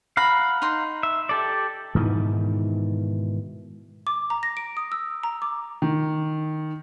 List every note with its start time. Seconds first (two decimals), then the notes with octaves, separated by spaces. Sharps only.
0.17 F5 F#5 A#5 B5
0.62 D#4 C6
1.03 E5
1.29 G4 A4 D5
1.95 G#2 B2 D#3 E3
4.07 D6
4.30 A#5
4.43 A#6
4.57 D7
4.77 D#6
4.92 E6
5.23 A#5
5.42 D6
5.82 D#3